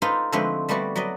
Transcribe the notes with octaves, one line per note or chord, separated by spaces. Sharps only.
D#4 F4 A4 B4 C5
D3 F3 G#3 A3 C4 B4
G3 A3 B3 F#4 D5
F#3 B4 D5 D#5